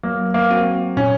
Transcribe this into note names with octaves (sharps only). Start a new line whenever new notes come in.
F#3 A#3
A#3
C4 F#4
A#2 C#4